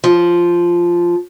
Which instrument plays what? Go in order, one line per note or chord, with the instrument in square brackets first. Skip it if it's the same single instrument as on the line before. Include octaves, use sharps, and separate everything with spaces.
[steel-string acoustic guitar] F3